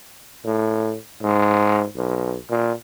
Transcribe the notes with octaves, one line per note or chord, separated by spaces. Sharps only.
A2
G#2
B1
A#2